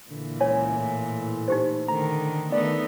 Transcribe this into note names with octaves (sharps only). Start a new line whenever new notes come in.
A#2 D3 E3
C#2 C#5 G#5
A2
D#4 G4 C5
D3 D#3 A3 A#5
D#3 A3 B3 D#4 D5